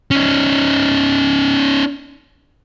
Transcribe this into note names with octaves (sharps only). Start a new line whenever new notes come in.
C#4 D#4